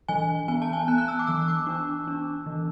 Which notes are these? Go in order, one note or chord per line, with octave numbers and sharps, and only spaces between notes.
E3 G#5
B3 G#5
A5
G#5
B3 F#6
F#6
E6
D6
E3 E6
D6
D4
D4
E3